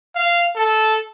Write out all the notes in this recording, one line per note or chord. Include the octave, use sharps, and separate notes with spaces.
F5
A4